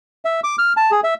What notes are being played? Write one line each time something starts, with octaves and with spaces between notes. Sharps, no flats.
E5
D6
F6
A5
G#4
E5